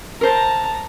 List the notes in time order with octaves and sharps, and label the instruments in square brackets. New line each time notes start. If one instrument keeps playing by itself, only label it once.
[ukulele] A#4 C5 [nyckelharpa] A5 A#5